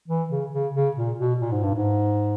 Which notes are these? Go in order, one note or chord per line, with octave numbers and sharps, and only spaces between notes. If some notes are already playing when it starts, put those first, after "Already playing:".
E3
C#3
C#3
C#3
A#2
B2
A#2
G#2
G2
G#2